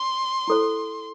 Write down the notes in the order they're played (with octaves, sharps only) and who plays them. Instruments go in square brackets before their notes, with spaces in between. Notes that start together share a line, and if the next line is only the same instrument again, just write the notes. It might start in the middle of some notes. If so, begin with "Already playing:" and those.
Already playing: [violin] C6
[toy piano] E4 A4 C5